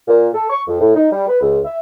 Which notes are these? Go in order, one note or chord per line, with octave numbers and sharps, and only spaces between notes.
A#2
A4
C#6
F2
A2
D#4
G3
B4
C#2
E5